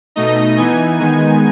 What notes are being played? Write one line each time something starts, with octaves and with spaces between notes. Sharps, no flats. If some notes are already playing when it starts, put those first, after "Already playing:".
B2 A3 D#4 D#5
E3 B3 D#4 G#5
D#3 G#3 B3 D#4 G#5